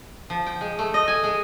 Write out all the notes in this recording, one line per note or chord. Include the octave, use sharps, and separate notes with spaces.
F3
G5
G#3
A3
D#5
G#5
G#3